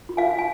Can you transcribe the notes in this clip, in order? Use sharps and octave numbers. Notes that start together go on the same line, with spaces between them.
F4
F5 G#5
F4
G#5